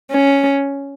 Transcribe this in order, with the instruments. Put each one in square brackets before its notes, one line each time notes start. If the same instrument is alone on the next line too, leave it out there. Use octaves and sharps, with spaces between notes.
[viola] C#4